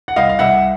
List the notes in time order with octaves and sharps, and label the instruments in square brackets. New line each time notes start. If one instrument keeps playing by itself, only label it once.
[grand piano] F#5
C2 D#5 F5
F5
C2 E5 F#5